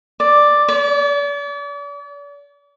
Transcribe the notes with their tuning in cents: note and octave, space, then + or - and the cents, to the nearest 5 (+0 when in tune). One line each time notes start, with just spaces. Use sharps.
D5 +5
D5 -40